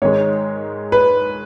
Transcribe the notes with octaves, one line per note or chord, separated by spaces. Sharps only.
G#2 D#3 G#3 C#5
B4